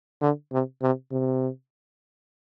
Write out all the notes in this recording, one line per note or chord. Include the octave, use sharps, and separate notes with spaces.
D3
C3
C3
C3